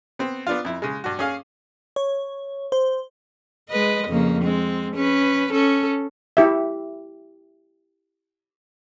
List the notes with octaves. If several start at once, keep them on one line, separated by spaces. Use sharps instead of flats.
B3 C4
B3 D4 F4
F2 E4
C#3 G#3
G2 F#4
C#4 G#4 F5
C#5
C5
G#3 B4 D#5
F2 C#3 A#3
G#3 C4
C#4 B4
C#4 A4
E4 G4 E5